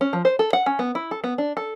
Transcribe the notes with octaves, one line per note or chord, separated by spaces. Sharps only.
C#4
F3
C5
A4
F#5
C#4
B3
E4
A4
B3
D4
A4